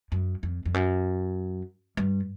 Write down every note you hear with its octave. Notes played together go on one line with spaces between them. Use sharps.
F#2
F2
F2
F#2
G2